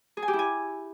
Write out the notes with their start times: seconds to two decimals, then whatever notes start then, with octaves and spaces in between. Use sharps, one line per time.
0.17 G#4
0.22 G#5
0.28 G4
0.33 E4
0.39 G#5